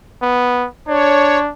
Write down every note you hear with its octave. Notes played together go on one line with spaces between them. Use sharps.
B3
D4 C#5